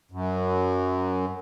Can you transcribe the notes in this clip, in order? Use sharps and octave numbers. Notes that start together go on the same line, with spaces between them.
F#2